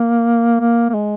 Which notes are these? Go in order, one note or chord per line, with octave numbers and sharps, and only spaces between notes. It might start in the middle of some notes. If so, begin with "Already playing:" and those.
Already playing: A#3
A#3
A#3
G#3